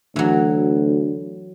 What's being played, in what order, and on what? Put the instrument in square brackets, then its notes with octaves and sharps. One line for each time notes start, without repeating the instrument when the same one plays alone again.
[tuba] D2 [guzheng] E3 F#3